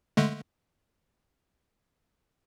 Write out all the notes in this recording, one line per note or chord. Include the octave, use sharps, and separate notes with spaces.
D3 G#3 A3